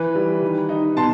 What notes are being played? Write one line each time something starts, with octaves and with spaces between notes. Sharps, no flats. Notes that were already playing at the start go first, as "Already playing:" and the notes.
Already playing: E3 B4
G3
D#3
D#4
B2 A5 C6